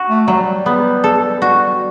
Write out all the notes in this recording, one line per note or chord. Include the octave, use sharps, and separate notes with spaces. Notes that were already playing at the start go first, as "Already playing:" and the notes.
Already playing: F#4
A3
F#3 G3
B3
A4
F#4